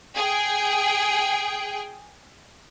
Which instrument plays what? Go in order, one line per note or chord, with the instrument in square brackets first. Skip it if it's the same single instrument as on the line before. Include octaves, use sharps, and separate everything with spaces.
[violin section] G#4 G5